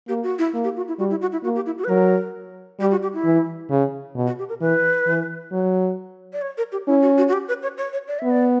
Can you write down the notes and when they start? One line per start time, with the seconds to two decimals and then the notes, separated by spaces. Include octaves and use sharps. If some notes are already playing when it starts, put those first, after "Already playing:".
0.08 A#3 G4
0.23 F#4
0.38 E4
0.54 A#3
0.64 G4
0.77 F#4
0.88 E4
0.99 G3 F#4
1.10 E4
1.21 F#4
1.32 E4
1.44 A#3 F#4
1.56 G4
1.66 E4
1.78 F#4
1.84 B4
1.89 F#3 A#4
2.80 G3 G4
2.91 F#4
3.03 G4
3.13 E4
3.25 E3
3.70 C#3
4.15 B2
4.27 F#4
4.39 G4
4.49 A#4
4.61 E3 B4
5.07 E3
5.52 F#3
6.33 D5
6.42 C#5
6.57 A#4
6.72 G4
6.87 C#4 E4
7.02 F#4
7.18 F#4
7.28 F#4
7.33 G4
7.48 B4
7.63 C#5
7.78 C#5
7.93 C#5
8.08 D5
8.19 B3 E5
8.30 D5